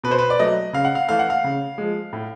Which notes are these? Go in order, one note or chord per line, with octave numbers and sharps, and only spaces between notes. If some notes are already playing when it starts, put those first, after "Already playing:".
B2 B4
C5
B4
D5
F#3 A3 D#5
C#3 F5
F#5
F5
E3 A3 F5
F#5
F5
C#3
F3 G#3
A2